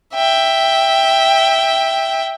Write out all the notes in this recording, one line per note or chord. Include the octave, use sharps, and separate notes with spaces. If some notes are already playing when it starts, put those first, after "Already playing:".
E5 G5